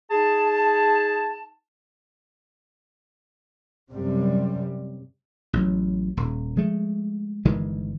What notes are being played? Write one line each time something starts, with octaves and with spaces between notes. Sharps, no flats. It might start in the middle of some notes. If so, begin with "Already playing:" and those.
D#4 G#4 A5
F#2 C3 G3
A1 F#3
D#1
F3 G#3 A3
G1 D#3 E3 G#3